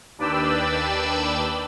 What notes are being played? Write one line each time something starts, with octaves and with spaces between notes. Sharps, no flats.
D#2 D4 B4 D5 G5 E6